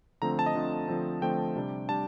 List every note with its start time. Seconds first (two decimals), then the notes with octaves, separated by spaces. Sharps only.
0.22 D3 F3 A3 C4 A#5
0.39 A5
0.46 D#5
0.55 D3 F3 A3 C4
0.88 D3 F3 A3 C4
1.22 D3 F3 A3 C4 G5
1.56 C3 G3 D4
1.89 C3 G3 D4 A5